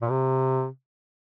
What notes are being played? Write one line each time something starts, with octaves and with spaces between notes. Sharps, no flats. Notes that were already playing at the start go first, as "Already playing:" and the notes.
A#2
C3